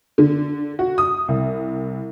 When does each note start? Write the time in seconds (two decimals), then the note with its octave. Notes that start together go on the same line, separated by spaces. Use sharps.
0.18 D3
0.79 F#4
0.98 D#6
1.28 C2